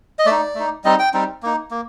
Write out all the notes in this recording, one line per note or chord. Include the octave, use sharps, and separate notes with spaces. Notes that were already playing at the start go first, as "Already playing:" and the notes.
D#5
A3 D5
D#4
A3 D#4
G3 C4 D#4 D#5
G5
G3 C4 D#4
A#3 D#4
A#3